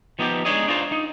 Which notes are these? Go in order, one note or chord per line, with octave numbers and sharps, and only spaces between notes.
F3 B3 D#4 F#4 G4
G#3 D4 D#4 G#4 C#5 D#5
D4 D#4 F4 C5
D#4